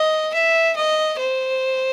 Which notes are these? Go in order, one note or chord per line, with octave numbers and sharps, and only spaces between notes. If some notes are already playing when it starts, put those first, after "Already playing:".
Already playing: D#5
E5
D#5
C5